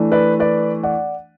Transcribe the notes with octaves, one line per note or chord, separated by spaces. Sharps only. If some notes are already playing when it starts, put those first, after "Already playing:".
Already playing: E3 A3 D4
B4 D5
B4 D5
D5 F#5